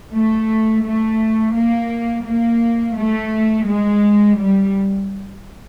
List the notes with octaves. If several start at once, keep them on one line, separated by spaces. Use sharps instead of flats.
A3
A3
A#3
A#3
A3
G#3
G3